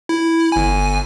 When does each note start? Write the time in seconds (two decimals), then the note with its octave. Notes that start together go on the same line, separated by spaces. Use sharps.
0.09 E4
0.52 G1 G#5